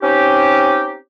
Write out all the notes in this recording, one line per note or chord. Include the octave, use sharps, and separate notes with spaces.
C4 C#4 D#4 G4